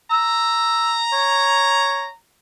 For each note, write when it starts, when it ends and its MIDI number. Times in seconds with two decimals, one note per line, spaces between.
0.11 2.12 82
0.11 0.96 88
1.13 2.07 73